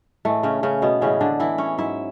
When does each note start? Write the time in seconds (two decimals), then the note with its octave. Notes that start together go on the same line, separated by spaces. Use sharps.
0.25 A2 E3 G#3 A3
0.43 C#3 C#4
0.63 C#3 C#4
0.82 B2 B3
1.01 A2 C#3 E3 G#3 C#4
1.21 D3 D4
1.40 E3 E4
1.58 C#4 C#5
1.78 G#2 F#3 E4 E5